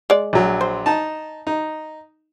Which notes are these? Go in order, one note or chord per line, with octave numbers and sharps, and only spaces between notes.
G#3 D5
A#1 F#3
C5
D#4 A5
D#4